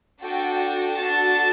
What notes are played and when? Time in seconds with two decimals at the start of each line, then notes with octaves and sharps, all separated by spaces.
0.21 D4 F#4 A4 G5
0.94 D4 F#4 A4 A5